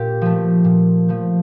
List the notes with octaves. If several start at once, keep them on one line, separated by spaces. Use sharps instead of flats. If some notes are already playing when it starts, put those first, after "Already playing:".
Already playing: A#2 G4
F3 A3
A#2
F3 A3